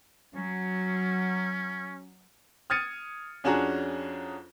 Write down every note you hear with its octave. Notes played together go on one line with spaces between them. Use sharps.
F#3 C#4
D#6 F6 G#6 A6 C#7 D#7
F2 C#4 D4 F#4 G#4 A#5